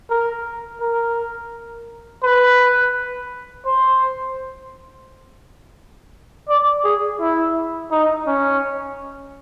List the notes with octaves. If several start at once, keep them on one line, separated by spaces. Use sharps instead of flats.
A#4
A#4
B4
C5
D5
G#4
E4
D#4
C#4